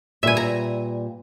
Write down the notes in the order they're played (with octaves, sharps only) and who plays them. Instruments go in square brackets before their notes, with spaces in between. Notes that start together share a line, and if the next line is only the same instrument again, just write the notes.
[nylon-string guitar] A#2 G3 B4 [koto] E5 G#5
[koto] A#5